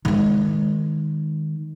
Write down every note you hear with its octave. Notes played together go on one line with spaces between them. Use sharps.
D#3 G#3